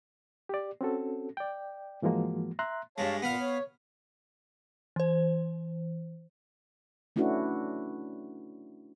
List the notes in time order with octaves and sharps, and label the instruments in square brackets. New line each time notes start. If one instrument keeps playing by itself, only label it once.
[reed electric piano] G4 D5
C4 C#4 F#4 A4
D5 G5
G#2 E3 F3 G#3 A#3 F#4
E5 A#5 C6 F#6
[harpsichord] G2 G#3 [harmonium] C#5 F5 A5
[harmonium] A#2 [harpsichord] B3 F5
[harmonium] C#5
[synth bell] E3 C5
[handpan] A3 C#4 D4 E4 F#4 B4